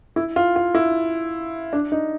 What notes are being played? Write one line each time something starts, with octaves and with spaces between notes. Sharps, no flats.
E4
F4
F4
E4
D4
D#4